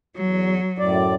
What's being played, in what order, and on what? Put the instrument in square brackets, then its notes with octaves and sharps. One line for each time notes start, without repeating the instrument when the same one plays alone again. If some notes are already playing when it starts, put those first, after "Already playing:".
[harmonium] E2 [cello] F#3
[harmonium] F#2 A2 D5